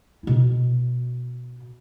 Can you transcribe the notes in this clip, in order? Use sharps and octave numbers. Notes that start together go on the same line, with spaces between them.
B2 E4